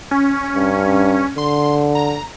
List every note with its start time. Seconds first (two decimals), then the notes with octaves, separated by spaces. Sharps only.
0.11 C#4
0.56 G2
1.38 D3 C6
1.95 A#5